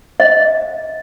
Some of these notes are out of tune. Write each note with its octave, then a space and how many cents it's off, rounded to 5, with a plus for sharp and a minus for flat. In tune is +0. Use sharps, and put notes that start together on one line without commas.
D#5 +30